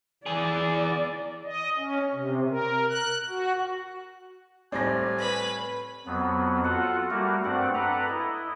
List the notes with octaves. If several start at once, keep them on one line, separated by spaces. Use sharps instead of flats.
E3 G#4 D5
D#5
C#4
C3
A#4
F#6
F#4
A2 G3 C4 D5 G#5 A#6
B4 B5
F2 F#3 B3
F4 F#4 A4 F#5
G3 A3 A#3 F#4 A#4
G2 A3 C4 D5 F#5
A4 B4 D5 F#5 A#5
E4 D#5